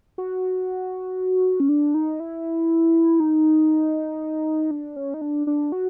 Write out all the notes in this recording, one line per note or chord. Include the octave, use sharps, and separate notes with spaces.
F#4
C#4
D4
D#4
E4
D#4
D4
C#4
D#4
D4
D4
F#4